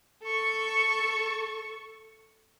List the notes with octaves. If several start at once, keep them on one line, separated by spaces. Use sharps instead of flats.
A4 C#6